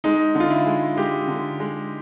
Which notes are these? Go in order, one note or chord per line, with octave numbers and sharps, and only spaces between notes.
G#3 D#4
D3
F4
E4
G#3
G#3 G4
D3
G#3